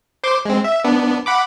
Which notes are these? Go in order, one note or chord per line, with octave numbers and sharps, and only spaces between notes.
C5 C6 D6
G#3 C4
E5
B3 D4
F#5 B5 D6